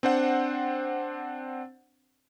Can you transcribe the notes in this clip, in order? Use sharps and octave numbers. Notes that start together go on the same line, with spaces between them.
C4 D4 C5 F#5